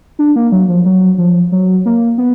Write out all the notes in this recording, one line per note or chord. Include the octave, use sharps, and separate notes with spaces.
D4
A#3
F#3
F3
F#3
F3
F#3
A#3
B3